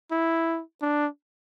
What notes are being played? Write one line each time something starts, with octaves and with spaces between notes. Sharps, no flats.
E4
D4